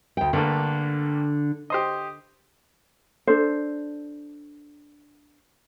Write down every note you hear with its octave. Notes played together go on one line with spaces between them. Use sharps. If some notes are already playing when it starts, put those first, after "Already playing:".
D2 G5
G2 D3 A3 A#3
G4 C5 D#5
D4 A4 C5